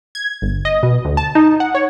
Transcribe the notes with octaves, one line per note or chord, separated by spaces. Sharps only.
G#6
G1
D#5
B2
D2
A5
D#4
F#5
C#5